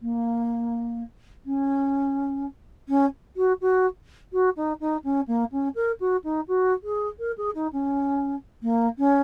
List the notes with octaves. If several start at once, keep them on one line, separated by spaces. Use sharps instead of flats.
A#3
C#4
C#4
F#4
F#4
F#4
D#4
D#4
C#4
A#3
C#4
A#4
F#4
D#4
F#4
G#4
A#4
G#4
D#4
C#4
A#3
C#4